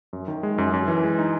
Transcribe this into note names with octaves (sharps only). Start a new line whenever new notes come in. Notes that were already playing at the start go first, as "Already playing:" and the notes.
F#2
D#3
G#3
F#2
F#2
E3
G#3
D#4